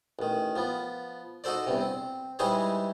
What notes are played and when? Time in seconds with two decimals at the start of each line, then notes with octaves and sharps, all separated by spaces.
0.19 A1 D#3
0.56 F3 B3
1.44 D#4 F#4 A4 C5 D5
1.67 E2 G2 C3
1.81 C4
2.39 E3 G3 G#3 D#4 C5 C#5